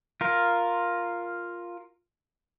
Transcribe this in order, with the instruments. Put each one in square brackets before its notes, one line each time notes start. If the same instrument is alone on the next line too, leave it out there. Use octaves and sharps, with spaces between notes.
[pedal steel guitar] F4 A#4